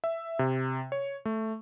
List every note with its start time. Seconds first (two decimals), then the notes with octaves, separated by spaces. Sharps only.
0.04 E5
0.39 C3
0.92 C#5
1.25 A3